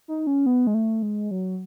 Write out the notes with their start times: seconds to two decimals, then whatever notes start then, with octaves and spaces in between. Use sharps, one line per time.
0.08 D#4
0.27 C#4
0.46 B3
0.67 G#3
0.74 A3
1.02 G#3
1.31 F#3